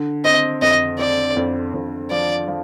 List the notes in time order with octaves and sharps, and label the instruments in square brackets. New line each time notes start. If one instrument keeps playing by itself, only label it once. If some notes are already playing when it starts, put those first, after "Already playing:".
Already playing: [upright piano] D3
[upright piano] C4 [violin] D#5
[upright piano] F2 [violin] D#5
[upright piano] C4 [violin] D5
[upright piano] F2
F2
[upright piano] F3 [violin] D5
[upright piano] F3